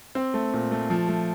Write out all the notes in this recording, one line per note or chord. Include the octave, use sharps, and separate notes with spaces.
C4
A3
A#2
A3
F3
A3